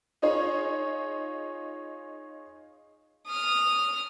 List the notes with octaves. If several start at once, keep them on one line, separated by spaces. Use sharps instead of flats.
D#4 F4 G#4 C#5
D#6 F6